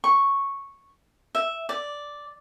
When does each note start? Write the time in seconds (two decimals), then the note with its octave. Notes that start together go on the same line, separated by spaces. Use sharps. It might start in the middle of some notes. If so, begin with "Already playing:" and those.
0.04 C#6
1.35 E5
1.69 D5